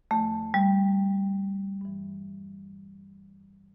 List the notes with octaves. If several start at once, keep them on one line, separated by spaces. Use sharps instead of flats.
E2 D3 F3 A3
G3
G2 E3